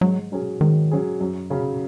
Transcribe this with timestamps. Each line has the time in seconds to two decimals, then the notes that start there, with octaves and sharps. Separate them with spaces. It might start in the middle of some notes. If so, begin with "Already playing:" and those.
0.01 G#2 F#3
0.32 F#3 C#4 G#4
0.61 G#2 D#3
0.91 F#3 C#4 G#4
1.21 F#2
1.50 C#3 F#3 C#4